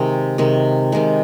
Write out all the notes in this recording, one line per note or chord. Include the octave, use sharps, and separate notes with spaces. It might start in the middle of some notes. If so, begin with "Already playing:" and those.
Already playing: C3 D#3 G#3
C3 D#3 G#3
C3 D#3 G#3